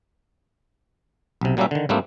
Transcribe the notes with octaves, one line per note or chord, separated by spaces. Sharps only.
B1 C3
A#2 F#3 G3 A#3 C#4 E5
D3 D#3
G#2 G3 A3 A#3 C4 D4